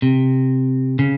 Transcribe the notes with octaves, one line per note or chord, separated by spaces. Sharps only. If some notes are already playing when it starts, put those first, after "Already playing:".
C3
C#3